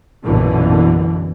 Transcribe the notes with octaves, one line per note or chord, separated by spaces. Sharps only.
A#1 F#2 B2 D3 E3